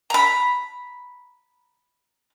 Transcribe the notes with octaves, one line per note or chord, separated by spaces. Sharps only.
A#5 B5